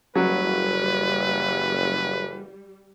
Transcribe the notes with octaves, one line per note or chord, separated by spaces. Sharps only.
F#1 E3 F#3 G3 B4